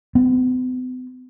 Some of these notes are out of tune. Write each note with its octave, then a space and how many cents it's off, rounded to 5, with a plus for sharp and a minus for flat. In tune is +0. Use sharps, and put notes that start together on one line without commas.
B3 +45